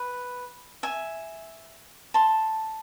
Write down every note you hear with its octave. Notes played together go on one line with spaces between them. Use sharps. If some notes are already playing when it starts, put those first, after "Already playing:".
Already playing: B4
E5 G#5
A5 C6